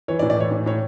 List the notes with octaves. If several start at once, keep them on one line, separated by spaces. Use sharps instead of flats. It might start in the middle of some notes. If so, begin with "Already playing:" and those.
E3 C#5
D5
A2
D5
E3 C#5
A2
A2 C#5